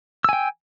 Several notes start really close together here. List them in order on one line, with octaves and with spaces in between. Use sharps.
E6 G#5 G5